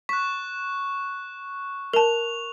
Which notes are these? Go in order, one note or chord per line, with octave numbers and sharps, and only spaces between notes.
C#6 F#6 B6
A#4 A5 F7